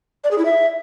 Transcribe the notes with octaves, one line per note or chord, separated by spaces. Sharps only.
D5
G#4
E4
E5